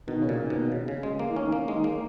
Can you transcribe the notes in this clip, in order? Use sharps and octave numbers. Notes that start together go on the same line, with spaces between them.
B2 D#3
C#3
A#2
D#3
B2
C#3
C#3
G#3
A#3
E3
D#3 C#4
A#3
D#3 G#3
A#3